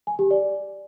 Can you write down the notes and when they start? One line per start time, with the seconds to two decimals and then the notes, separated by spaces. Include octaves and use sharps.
0.07 G#5
0.19 G4
0.31 D5